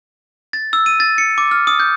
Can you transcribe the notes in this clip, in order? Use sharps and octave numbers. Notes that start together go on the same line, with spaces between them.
A6
E6
D#7
A6
C#7
D6
F6
D#6
G6